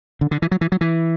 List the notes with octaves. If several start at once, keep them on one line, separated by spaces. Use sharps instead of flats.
D3
D3
E3
F#3
E3
F#3
E3